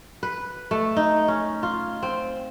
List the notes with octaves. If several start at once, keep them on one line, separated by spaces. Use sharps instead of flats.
B4
A3
D#4
C#4
F4
C4